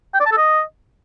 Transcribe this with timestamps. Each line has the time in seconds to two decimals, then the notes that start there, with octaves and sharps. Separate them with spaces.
0.14 G5
0.20 D5
0.26 A5
0.32 A4
0.38 D#5